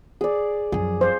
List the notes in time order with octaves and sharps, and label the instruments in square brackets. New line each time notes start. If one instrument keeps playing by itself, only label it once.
[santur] G#4 D5
[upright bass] F#2 F3 [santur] G#4
[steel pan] C5